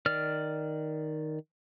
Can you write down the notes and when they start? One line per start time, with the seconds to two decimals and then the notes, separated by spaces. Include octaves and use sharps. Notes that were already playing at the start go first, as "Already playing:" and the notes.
0.06 D#3 D5 F6